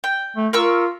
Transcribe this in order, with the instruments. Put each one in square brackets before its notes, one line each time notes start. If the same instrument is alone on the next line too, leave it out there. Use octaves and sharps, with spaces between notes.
[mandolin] G5
[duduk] A3
[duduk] F4 [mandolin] A#4 C#6 E6